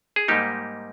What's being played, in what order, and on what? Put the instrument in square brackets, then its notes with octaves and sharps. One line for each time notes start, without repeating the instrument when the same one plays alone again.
[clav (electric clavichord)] G#4
G#2 G3 A#3 D#4 G4